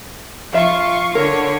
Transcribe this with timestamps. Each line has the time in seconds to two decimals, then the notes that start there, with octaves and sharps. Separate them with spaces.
0.53 F3 F4 E5 C#6
1.15 D3 A#4 C#5